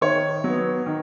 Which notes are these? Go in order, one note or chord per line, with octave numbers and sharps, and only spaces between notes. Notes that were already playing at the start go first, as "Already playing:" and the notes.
D#3 C#5
F#3 B3
D#3